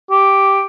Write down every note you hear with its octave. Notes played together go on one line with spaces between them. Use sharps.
G4